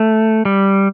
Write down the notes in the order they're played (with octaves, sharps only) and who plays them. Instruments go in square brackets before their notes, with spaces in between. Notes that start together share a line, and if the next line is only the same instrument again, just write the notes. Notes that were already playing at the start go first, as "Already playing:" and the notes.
Already playing: [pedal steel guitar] A3
G3